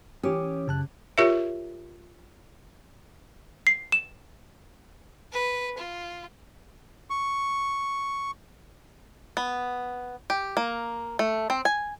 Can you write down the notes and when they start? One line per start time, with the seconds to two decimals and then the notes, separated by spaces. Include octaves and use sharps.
0.23 E3 C#4 G4 D6 D#6
0.68 F#2 C#3 A5 F#6
1.18 F4 G4 A#4 C#5 E5
3.67 C7
3.92 E7
5.32 B4
5.77 F4
7.10 C#6
9.37 B3
10.30 G4
10.57 A#3
11.19 A3
11.50 C4
11.65 G#5